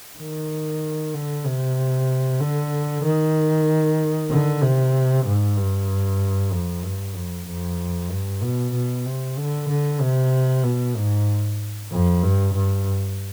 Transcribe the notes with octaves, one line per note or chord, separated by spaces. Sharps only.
D#3
D3
C3
D3
D#3
D3
C3
G#2
G2
F2
G2
F2
F2
G2
B2
B2
C3
D3
D3
C3
B2
G#2
F2
G2
G2